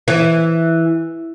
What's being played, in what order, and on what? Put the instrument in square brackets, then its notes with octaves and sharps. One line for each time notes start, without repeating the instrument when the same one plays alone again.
[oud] E3